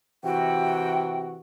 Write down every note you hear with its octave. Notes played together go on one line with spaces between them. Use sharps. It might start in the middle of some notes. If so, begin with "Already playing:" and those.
C3 E3 F#4 G5